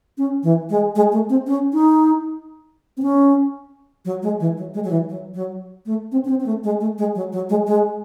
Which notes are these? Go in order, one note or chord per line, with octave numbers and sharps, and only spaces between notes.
C#4
E3
G#3
G#3
A3
C4
C#4
D#4
C4
C#4
F#3
G#3
E3
F#3
G#3
F#3
E3
F#3
F#3
A3
C4
C#4
C4
C4
A3
G#3
A3
G#3
F#3
F#3
G#3
G#3